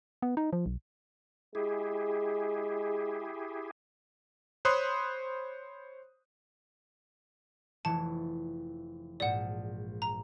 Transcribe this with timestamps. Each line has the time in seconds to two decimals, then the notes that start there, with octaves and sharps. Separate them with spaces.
0.22 B3
0.37 D#4
0.53 F3
0.66 B1
1.55 G#3 E4 G4 G#4
4.65 C5 C#5 B5 C6 D#6 F#6
7.85 F1 E3 A5 C#6
9.20 A#1 G#2 D5 F#5 E7
10.02 A#5